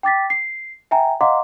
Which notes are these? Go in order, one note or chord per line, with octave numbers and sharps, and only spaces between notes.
G5 D6 A6 B6
C7
E5 G5 G#5 A#5
D#5 F5 F#5 A#5 C6 D6